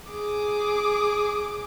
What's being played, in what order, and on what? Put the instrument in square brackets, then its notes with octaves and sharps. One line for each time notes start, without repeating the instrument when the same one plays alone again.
[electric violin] G#4 D6